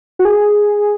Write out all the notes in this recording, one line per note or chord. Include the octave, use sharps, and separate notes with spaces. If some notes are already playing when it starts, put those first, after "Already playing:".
F#4
G#4